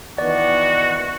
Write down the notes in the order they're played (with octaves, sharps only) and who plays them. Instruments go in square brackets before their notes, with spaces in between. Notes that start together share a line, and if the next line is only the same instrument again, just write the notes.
[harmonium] D#3 E3 B3 [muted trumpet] F#4 [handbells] D5